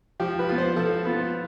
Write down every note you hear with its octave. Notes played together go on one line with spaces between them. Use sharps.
F3 G4
B4
B3 F4
C5
F3 A4
B3 F4